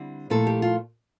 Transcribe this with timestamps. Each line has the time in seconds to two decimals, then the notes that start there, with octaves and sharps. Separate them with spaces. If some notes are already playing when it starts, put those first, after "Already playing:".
Already playing: D3 G3 C4 E4
0.30 A#2 F3 A3 E4 A4
0.47 G4
0.62 F4